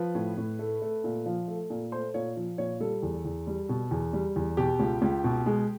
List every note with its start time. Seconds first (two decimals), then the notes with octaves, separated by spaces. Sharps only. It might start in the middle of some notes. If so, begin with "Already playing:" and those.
Already playing: F3 B4
0.15 A2
0.37 A2
0.59 A3
0.82 A3
1.04 A#2
1.26 F3
1.48 A3
1.70 A#2
1.92 A3 C5
2.14 A#2 C#5
2.36 F3
2.58 A#2 C#5
2.80 G3 A4
3.03 E2
3.25 E2
3.47 G3
3.69 B2
3.91 E2
4.13 G3
4.36 E2
4.57 B2 G4
4.80 C#2
5.02 C#2
5.24 B2
5.46 G#3